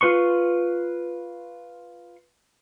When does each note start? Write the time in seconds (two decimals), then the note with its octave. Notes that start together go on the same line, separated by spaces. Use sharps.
0.01 F4 B4 C6 C#6